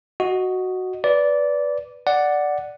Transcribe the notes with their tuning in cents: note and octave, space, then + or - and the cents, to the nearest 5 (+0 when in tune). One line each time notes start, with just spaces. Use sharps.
F#4 +0 D#5 +0
B4 +0 D5 -15
D5 +0 F#5 +0